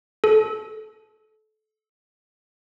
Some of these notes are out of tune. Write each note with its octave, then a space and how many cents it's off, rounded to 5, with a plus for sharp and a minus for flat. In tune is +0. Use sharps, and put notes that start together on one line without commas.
A4 -25